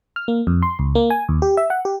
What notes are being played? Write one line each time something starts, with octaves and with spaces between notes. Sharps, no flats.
F6
A#3
F2
C6
C#2
A#3
G#5
D#2
G4
E5
F#5
G4